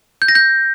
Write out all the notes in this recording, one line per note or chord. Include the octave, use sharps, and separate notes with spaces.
G6
A#6
G6